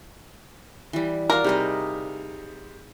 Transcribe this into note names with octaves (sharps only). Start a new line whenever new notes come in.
E3 G3
F#4 A#4 D5 F5
C3 G3 D#4 G#4 D#5